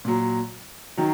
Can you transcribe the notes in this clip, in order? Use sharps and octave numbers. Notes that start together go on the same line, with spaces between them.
A#2 F#3
D#3 F#3